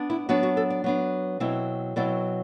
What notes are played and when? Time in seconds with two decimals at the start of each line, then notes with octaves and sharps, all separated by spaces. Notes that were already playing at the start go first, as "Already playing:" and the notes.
Already playing: B3 D4
0.10 E4
0.29 F#3 B3 D4 F#4
0.43 F#4
0.57 A4
0.70 D5
0.84 F#3 B3 D4
1.40 B2 F#3 C4 E4
1.96 B2 F#3 C4 E4 D5